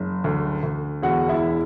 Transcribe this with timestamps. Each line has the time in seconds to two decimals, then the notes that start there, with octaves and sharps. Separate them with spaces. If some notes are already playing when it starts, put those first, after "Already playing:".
Already playing: F#1
0.24 D2
0.63 D2
1.02 E1 F#4 F#5
1.29 E4 E5
1.43 E3